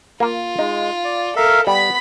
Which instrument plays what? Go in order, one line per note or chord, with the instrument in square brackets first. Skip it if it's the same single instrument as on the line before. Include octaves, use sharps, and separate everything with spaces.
[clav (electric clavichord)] A#3 A#4 [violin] F4
[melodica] G#3 [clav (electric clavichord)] D#4
[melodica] D5
[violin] A4 [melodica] A#4 E5 F5
[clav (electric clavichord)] G3 [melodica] B3 [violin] B5 B6